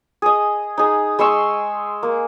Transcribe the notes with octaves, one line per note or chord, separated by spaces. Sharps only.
G#4 D#5
D#4 G#4
G#3 C6 C#6 E6
A#3